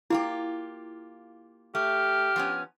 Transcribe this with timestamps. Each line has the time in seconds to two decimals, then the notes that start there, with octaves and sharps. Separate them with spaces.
0.10 A#3 E4 F4 G4
1.75 A3 G4 F6
2.36 F3 B3 C#4